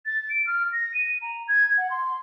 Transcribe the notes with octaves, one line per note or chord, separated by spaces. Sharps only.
A6
D7
F6
A#6
D#7
A#5
G#6
F#5
C6